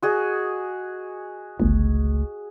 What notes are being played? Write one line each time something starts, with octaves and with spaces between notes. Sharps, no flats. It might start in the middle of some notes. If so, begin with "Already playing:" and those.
F#4 G#4 D#5
G1 C#2 A3